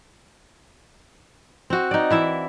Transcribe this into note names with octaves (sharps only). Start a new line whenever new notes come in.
C4 F#4
D#4 D5
E3 E4 E5